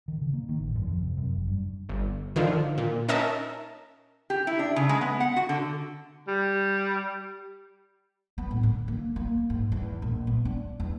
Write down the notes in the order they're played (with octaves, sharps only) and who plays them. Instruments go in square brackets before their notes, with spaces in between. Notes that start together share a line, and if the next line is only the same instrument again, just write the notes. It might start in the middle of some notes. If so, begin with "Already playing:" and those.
[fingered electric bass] D#3
C#3
A#3
D#3
A1
F#2
F2
C3
F#2
F#1
G2
[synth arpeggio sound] G1
D3 D#3 F3
A#2
C#4 D#4 A#4 D#5 E5 A5
[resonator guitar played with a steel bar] G4
E4
D4
C#3
G#3
B3
F#5
F#4
D3
[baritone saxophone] G3
[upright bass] B3
A2
D3
A#3
A#3
G#2
E2
A#1
B3
D4
E2